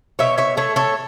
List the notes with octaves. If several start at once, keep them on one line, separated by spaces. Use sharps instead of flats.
B2 C#5 E5
C#5 E5
A3 A4 C#5
A4 C#5